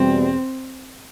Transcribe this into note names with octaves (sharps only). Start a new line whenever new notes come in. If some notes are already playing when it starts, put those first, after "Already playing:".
Already playing: E2 B2 G3 C4